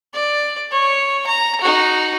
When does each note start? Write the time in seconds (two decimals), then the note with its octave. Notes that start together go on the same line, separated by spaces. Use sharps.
0.14 D5
0.72 C#5
1.27 A#5
1.61 D#4 F#4